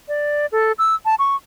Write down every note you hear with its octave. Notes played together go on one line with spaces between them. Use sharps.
D5
A4
E6
A5
C#6